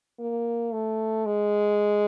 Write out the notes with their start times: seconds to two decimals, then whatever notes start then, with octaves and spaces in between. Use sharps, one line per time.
0.19 A#3
0.73 A3
1.25 G#3